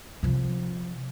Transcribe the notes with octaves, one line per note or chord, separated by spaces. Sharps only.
C3 F3